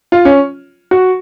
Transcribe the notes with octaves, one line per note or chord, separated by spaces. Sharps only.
F4
C#4
F#4